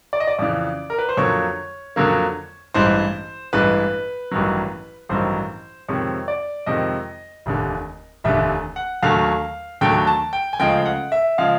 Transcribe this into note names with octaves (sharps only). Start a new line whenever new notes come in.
D5
D#5
D5
F2 C#3 E3 D5
A#4
B4
C5
F2 D3 F#3 A#3 C#5
F2 D3 F#3 A#3
A1 G2 E3 G#3 C5
A1 G2 E3 G#3 B4
A1 G2 D#3 F#3
A1 G2 D#3 F#3 C5
F2 C3 D#3 G#3 C#5
D5
F2 C3 D#3 G#3 D#5
F1 D#2 D3
F1 D#2 D3 E5
F#5
D#2 D3 F#3 A3 F5
D#2 D3 F#3 A3 G5
A5
G5
G#5
D2 C#3 F3 G#3 G5
F#5
E5
C#3 F3 G#3 F5